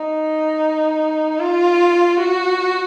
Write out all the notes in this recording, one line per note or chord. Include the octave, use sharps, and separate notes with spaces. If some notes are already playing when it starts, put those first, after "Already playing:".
Already playing: D#4
F4
F#4